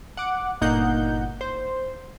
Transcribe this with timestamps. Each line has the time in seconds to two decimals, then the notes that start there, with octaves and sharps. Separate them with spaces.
0.17 F#5 D6
0.61 G1 A#2 A#3 D#4 F#5 G6
1.41 C5